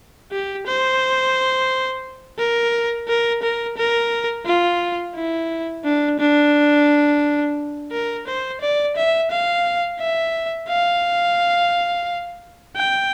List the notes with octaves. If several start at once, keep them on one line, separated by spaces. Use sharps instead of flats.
G4
C5
A#4
A#4
A#4
A#4
F4
E4
D4
D4
A#4
C5
D5
E5
F5
E5
F5
G5